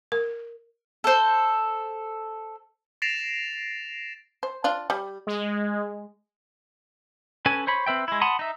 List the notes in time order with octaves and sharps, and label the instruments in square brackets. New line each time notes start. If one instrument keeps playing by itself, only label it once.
[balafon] A#4
[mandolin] A4 C5
[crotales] A6 A#6 C7 D7 E7 F7
[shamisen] C5
D4 F4
G3
[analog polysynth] G#3
[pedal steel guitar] C#4 A4 B4 G#5
C5 C#5 B5
C4 B4 E5 G5
G#3 E4
F#5 A5 B5 C6 D#6
D#4 E5